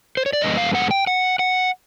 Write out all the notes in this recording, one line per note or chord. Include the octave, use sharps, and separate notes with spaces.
C5
C#5
D5
G2 D3 F3 G#3 B3 D#5
F5
F#5
G5
F#5
F#5